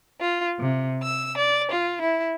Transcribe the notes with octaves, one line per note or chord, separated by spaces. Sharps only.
F4
C3
E6
D5
F4
E4